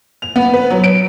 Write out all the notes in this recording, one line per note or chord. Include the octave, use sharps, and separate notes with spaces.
F7
B3
B4
F#3
D7